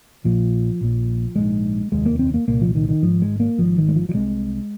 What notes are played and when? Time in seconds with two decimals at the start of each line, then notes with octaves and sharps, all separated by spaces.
0.24 A#1 A#2 F3
0.81 A#1 A#2
1.36 A#1 G#2 G#3
1.92 F1 D#2 G#3
2.06 A#3
2.19 C4
2.34 A#3
2.48 C2 A#2 A#3
2.61 F3
2.75 D#3
2.89 D#3
3.03 G#1 G#2 F3
3.22 G#3
3.40 A#3
3.58 G#1 G#2 F3
3.77 D#3
3.88 G#3
3.95 F3
4.09 F3
4.14 C2 C3 G#3